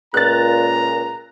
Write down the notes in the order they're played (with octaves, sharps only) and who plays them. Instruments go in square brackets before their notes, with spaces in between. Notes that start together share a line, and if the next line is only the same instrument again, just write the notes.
[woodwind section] C#2 A#2 [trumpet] A#5 [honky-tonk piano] F#6 A6